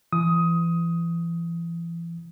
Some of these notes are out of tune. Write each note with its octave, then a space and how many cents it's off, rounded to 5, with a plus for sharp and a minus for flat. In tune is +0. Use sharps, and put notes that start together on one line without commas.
E3 +35 D#6 +15